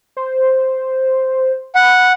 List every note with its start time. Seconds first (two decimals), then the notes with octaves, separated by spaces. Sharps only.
0.17 C5
1.75 F#5 B5